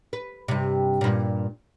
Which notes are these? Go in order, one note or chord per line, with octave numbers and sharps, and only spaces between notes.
B4
G2 C3
G2 A#2